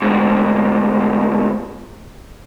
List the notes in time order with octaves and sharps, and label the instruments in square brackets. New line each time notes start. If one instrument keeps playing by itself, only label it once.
[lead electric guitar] D2 G#2